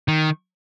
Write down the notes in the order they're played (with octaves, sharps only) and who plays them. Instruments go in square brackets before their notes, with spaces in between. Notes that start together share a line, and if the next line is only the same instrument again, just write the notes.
[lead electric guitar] D#3